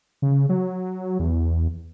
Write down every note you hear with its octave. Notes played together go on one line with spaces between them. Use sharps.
C#3
F#3
E2